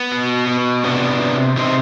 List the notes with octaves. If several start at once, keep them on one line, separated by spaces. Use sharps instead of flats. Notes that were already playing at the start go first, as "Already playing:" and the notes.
Already playing: B3
B2
B2
C3 B3 D4
C3
C3 C4 D#4